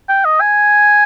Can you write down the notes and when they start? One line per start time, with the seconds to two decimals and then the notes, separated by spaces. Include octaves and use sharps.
0.09 G5
0.25 D#5
0.41 G#5